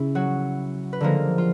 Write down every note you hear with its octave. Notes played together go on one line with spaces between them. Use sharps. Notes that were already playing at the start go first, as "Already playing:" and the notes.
Already playing: C#3 C#4 E4
F#3 F#4
B4
D3 F3 G#3 A#3 A#4
F4